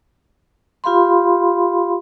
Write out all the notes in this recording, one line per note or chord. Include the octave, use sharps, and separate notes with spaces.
F4 G4 F5 B5 C6